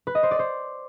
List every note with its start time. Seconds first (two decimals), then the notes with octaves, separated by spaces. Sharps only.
0.07 B4
0.15 D#5
0.23 C5
0.31 D5
0.39 C5